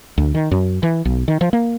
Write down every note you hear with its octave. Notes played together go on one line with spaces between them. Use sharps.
D2
D#3
F#2
E3
B1
D#3
F3
A#3